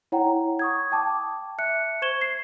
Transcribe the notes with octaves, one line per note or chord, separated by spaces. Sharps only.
E4 C#5 F#5 G5 A#5
C#6 D#6 G#6
G5 A5 D6
E5 F#6 C#7
C5 C#6 G#6 E7 G7
C7